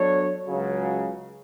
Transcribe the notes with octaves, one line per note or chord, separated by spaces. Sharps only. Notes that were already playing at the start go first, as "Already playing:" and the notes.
Already playing: F#3 B3 D4 A4 C#5
C#2 C#3 F#3